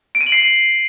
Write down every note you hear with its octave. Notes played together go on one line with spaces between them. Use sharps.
D7
D#7
F#7
C7